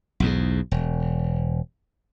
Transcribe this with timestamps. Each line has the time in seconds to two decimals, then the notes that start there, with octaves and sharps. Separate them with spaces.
0.20 B1 E2 G#2
0.71 E1